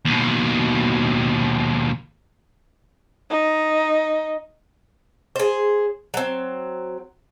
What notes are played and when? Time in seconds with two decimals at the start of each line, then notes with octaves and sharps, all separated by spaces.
0.05 D#2 B2
3.30 D#4
5.36 G#4 C5
6.14 F#3 C4